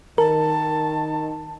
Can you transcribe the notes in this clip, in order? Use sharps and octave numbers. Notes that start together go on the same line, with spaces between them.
D#3 A#4 A5